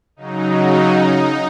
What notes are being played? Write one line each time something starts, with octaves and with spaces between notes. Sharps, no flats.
C#3 F#3 D#4